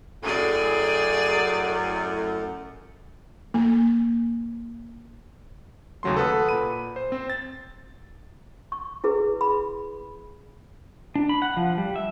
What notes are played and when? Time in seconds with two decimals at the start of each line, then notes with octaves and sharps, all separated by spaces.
0.23 F#2 A2 G#4 D5
3.54 A#3
6.03 D#2 C#3 F#3 A3 C6
6.17 A4 B4 F#5 D#6
6.49 A#2 B5 D#7
6.96 C5
7.12 C4
7.30 A6
8.72 C#6
9.04 E4 G#4 B4
9.41 B5
11.15 D4
11.29 B5
11.42 F#5
11.57 F3
11.78 G3
11.96 E5